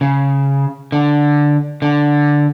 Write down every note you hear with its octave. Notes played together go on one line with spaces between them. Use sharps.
C#3
D3
D3